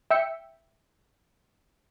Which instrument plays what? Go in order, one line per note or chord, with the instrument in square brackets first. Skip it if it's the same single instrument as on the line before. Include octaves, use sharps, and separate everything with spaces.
[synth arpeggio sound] E5 G5 E6 C#7